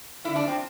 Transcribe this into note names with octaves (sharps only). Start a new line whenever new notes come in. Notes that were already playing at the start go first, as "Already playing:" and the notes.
D3 E4
D4
F3
C4